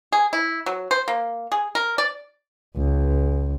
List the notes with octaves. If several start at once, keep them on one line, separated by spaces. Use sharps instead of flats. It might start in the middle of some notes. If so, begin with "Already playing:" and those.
G#4
E4
F#3
C5
A#3
G#4
A#4
D5
C#2